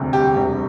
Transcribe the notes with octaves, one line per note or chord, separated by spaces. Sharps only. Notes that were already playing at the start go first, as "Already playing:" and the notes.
Already playing: E1 D2 C3 G3
G4
E1 D2 C3 G3